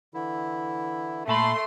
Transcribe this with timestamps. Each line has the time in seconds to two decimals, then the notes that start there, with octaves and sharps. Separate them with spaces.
0.14 D3 E3 E4
1.28 A#2 A3 A5 B5 C6